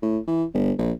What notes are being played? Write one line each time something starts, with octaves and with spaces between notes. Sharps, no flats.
A2
E3
G1
A#1